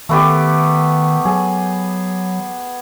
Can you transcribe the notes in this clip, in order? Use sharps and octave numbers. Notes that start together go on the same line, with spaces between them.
D#3 A3 B3 G4
F#3 G#4